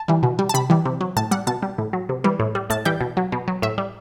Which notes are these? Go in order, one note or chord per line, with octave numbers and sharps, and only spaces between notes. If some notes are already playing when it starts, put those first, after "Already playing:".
Already playing: A5
E3 G3
B2
G3
A5
C3 B5
E3 G3
C3
F#3
A2 A5
G3 F#5
B2 A5
G3
A2
F#3
C3
E3 G3
A2
G3
A2 A5
E3 G3 G5
B2
F#3
B2
F#3
A2 E5
G3